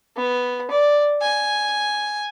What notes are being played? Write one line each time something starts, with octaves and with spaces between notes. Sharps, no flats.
B3
D5
G#5